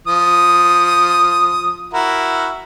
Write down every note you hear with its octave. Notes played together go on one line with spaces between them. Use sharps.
F3 D#6
E4 F#4 A#4